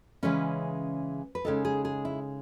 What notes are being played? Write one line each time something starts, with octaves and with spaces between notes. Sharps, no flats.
C#3 E3 G#3 C#4 B4
B4
C#3 G#3 D#4 A4
G#4
G#4
E4